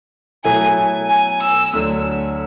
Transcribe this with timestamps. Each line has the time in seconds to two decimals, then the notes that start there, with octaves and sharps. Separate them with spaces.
0.44 B2 F#3 A3 E4 G#5
1.09 G#5
1.41 E6
1.73 D2 D3 F#3